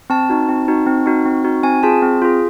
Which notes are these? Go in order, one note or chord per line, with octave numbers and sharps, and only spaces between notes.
C4 A5
D#4 F#4
C4
D#4 F#4
C4
D#4 F#4
C4
D#4 F#4
C4 G#5
F4 G#4 A5
C4
F4 G#4